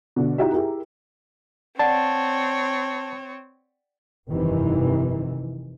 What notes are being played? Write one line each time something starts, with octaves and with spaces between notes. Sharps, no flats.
B2 D3
D#4 E4 F#4 G4 D#5 E5
E4 G4 G#4 A#4
C4 C#5 D5 F#5 A5
F1 G2 C3 D#3 E3